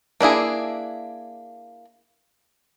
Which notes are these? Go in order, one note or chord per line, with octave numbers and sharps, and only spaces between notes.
A#3 D4 E4 G#4